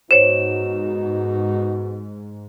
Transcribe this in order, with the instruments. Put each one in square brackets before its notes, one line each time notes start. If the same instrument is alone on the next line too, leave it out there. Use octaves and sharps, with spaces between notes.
[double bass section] G#2 [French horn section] B2 D#4 F#4 [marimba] C5 C#5 [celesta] E7